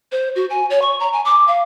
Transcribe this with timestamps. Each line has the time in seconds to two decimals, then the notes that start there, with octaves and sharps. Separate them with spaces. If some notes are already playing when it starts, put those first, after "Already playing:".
0.12 C5
0.36 F#4
0.50 G#5
0.70 C#5
0.82 C#6
1.00 A#5
1.13 G#5
1.25 D6
1.47 F5